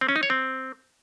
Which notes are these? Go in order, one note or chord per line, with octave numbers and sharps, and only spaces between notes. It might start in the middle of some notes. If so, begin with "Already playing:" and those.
C4
C#4
D#4
C#5
C4